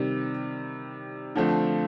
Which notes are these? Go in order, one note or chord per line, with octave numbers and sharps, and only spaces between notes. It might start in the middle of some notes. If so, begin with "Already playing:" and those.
Already playing: C3 D#3 G3
D3 F3 A3 C4